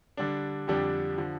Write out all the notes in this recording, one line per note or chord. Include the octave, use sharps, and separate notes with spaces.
D3 G3 D4
F2 D3 G3 D4 G4
D3 F3